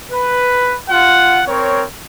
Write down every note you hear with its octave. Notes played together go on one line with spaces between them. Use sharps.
B4
F4 F#5
C4 A#4 C#5